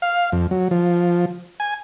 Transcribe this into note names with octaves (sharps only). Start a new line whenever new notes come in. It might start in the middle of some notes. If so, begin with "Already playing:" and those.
F5
F2
F#3
F3
G#5